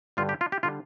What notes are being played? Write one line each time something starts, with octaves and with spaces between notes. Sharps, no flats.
G2 D3 G3 F4
G4
F4
G4
D3 G3 F4